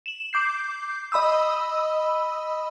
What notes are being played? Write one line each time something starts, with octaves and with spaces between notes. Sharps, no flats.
E7 F#7
D6 G6 C7
D#5 B5 D#6 E6